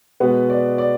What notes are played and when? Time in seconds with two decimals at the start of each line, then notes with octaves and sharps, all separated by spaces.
0.20 B2 G#3 B3 B4
0.50 D5
0.78 D5